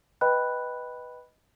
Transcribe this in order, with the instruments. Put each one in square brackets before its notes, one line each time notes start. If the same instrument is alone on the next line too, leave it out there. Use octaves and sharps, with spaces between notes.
[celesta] B4 D#5 G5 B5 F#6